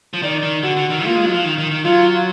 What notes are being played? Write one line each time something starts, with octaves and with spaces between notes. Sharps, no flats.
F3
D#3 D5
D#3
D3 F#4
D3
D#3
A#3 F4
G#3
F#3
F3
D#3
D#3
D#3
F#3 F4